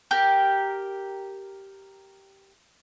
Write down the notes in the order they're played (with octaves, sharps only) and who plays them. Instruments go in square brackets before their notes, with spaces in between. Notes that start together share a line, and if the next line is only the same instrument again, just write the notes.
[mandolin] G4 A#4